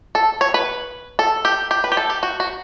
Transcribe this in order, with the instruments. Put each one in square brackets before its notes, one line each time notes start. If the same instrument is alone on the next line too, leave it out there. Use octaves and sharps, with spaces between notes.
[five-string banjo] A4
C#5
B4
A4
G4
G4
B4
G4
A4
G4
F#4
F#4